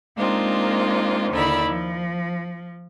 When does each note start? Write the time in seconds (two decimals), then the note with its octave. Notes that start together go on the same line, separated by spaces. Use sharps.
0.17 G#3 A#3 C4 D4 D#4 F4
1.31 D#2 D3 D#4 E4 D5 B5
1.67 F3